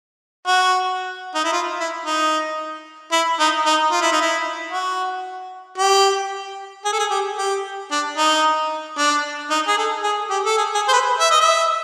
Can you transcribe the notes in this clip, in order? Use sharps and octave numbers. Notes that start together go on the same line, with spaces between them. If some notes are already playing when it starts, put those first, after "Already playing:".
F#4
D#4
E4
F4
E4
D#4
E4
D#4
D#4
F4
E4
D#4
E4
F#4
G4
G#4
A4
G#4
G4
G4
D4
D#4
D4
D#4
G#4
A4
G#4
G4
A4
G#4
G#4
C5
B4
E5
D#5
E5